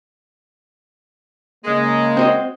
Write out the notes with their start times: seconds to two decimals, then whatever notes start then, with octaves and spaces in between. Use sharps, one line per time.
1.65 C#3 G#3 A#3
2.17 C4 F#4 D#5